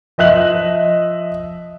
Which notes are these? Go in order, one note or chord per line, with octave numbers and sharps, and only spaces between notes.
F3 D#5 E5 F#6 F#7